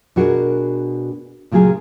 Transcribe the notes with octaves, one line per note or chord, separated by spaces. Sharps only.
B2 D4 F#4 G#4 A#4
A#2 C#3 F#3 G4 G#4